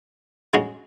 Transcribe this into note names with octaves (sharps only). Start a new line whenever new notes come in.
C#3 G#3 C#4 F#4